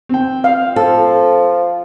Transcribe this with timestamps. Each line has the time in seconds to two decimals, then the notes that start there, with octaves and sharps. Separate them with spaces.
0.09 C4 G5
0.44 F5
0.76 F3 A4